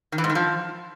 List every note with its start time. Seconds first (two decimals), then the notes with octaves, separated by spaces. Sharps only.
0.12 D#3
0.18 E3
0.24 G#2
0.30 D#3
0.35 F3